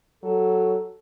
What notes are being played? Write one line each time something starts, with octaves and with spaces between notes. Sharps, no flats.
F#3 A4